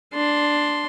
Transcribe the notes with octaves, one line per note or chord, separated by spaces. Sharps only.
D4 C6